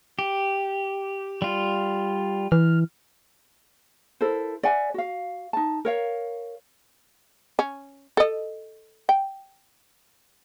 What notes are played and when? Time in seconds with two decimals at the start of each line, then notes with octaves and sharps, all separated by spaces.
0.19 G4
1.42 G3 F4
2.52 E3 F6
4.21 E4 A4 A#4 C5
4.63 D5 E5 F#5 G#5
4.94 F#4 F5
5.53 D#4 A5
5.85 A#4 C#5 F5
7.59 C#4
8.17 A4 D#5
9.09 G5